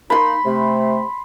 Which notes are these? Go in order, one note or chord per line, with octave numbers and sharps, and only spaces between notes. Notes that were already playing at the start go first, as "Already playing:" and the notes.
A#3 D#4 B5 C6
C3 A3